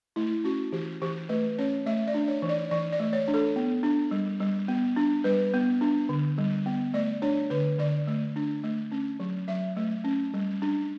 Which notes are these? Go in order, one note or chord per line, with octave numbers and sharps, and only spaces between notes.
A3 E4
C#4 F#4
E3 G4
E3 G4
A3 B4
C#4 C#5
A3 E5
D5
D4
C#5
E3
D5
E3 D5
D5
A3
C#5
D4
A4
B3
D4
G3
G3
B3
D4
G3 B4
B3
D4
D3
G3
B3
A3 D5
D4 C#5
D3 B4
D3 D5
A3
D4
A3
C#4
F#3
F#3 E5
A3
C#4
G3
D4